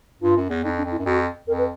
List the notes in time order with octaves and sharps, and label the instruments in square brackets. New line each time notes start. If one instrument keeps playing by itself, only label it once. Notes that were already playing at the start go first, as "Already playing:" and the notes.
[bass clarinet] G2 [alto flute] F4
[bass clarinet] F#2
E2
[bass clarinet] F2 [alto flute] D#4
[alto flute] D4
[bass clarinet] F2
[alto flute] E4
[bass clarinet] F#2
[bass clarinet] F2 [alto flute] F#4
[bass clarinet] F2 [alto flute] A#4
[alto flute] B4